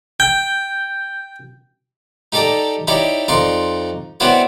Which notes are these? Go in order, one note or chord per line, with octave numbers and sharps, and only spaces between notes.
G5 G6
D#4 G4 A4 D5 A#5
D#4 E4 G4 C#5 D5
F2 D#4 D5 C6 C#6
B3 C4 E4 F#4 C#5 D5